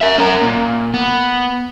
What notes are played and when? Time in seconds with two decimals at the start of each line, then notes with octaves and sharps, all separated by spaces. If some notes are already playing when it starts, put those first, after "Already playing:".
0.01 A#4 E5
0.18 C#4 A#4
0.42 A#2
0.94 B3